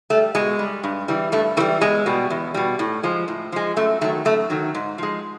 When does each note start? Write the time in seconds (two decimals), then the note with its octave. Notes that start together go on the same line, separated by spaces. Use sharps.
0.10 G3 A3
0.35 B2 G#3
0.59 G3
0.84 G2
1.08 E3 G3
1.32 G2 A3
1.57 E3 A3
1.60 G3
1.81 E2 G#3
2.06 B2 G3
2.30 E2
2.54 B2 G3
2.79 A2
3.03 F3 G#3
3.28 A2
3.52 F3 G#3
3.76 F#2 A3
4.01 D#3 A3
4.04 F#3
4.25 F#2 A3
4.50 D#3 F#3
4.75 G#2
4.98 F3 G#3